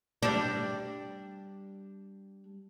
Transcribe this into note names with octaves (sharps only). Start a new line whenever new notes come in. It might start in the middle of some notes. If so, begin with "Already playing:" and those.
G3 D4